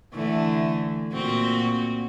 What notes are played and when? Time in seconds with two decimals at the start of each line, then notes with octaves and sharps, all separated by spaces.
0.13 D3 E3 A3
1.13 A#2 C4 F#4